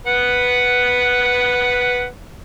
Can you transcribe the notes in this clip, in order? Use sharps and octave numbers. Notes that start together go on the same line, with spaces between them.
B4 F#5